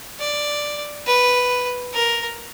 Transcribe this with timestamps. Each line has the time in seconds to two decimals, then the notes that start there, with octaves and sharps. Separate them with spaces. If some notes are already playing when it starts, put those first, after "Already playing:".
0.20 D5
1.06 B4
1.94 A#4